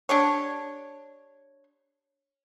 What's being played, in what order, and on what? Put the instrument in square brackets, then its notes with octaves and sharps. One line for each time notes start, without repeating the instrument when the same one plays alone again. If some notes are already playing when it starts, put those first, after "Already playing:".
[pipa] D4 G4 C#5